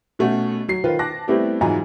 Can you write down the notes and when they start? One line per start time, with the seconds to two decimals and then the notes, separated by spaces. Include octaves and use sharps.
0.19 B2 A3 C#4 F#4
0.68 F#3 C7
0.84 D#3 F4 B4 C5
0.99 A5 D6 F#6 A#6
1.28 G3 A3 B3 C4 E4 G4
1.61 G#2 E3 F#3 F4 G#5 A#5